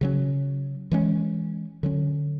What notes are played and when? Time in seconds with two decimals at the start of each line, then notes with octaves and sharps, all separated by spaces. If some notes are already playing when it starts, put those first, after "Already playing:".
0.01 C#3 F#3 C#4
0.92 E3 G#3 C#4
1.83 D3 F#3 C#4